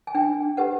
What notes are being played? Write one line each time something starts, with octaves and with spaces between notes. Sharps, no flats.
G#5
D4 G5
G4 B4 F#5